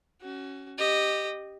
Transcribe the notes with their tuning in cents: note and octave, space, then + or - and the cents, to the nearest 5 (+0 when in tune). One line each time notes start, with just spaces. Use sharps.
C#4 +0 F#4 +25
G4 +0 D#5 -10